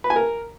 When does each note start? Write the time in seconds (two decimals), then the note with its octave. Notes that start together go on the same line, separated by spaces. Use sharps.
0.04 B4
0.10 G#5
0.16 A#4